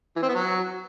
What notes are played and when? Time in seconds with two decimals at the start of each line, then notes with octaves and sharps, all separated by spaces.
0.16 E3
0.22 C4
0.29 B3
0.35 F#3